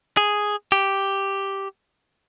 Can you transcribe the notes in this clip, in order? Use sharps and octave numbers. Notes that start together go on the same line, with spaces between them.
G#4
G4